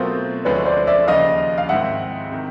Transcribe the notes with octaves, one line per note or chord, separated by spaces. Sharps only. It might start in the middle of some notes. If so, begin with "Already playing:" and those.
Already playing: B2 F#3 A3 C4 F4 A#4 C5
D2 D3 F3 G#3 B4 C#5
C5 D5
D5 E5
D#2 C#3 F3 D#5 F5
F5
G#2 D#3 G#3 C4 E4 E5 F#5
C3 D#3